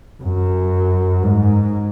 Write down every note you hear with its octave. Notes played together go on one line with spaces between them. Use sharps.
F#2
G#2